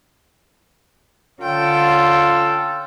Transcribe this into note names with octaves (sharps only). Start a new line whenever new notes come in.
D3 C#4 F4 A4 G5